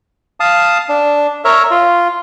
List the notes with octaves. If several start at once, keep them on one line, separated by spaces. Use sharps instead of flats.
F5 A5 D#6
D4
A#4 C#5 E5
F4